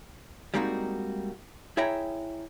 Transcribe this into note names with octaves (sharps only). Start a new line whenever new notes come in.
G3 G#3 A#3 C4 D#4 F#4
E4 G#4 C#5 E5 G5 A#5